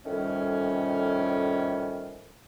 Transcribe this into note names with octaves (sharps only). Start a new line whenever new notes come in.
F2 A2 D#3 G3 C#4